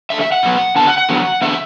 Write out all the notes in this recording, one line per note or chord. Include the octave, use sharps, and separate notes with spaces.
D3 A3 E5
E5
F#5
B2 F#3 B3
D3 B3 A5
F#5
F#5
D3 F#3 B3
D3 B3 E5